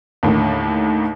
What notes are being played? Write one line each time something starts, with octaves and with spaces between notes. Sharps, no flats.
D#2 A2 D3 D#3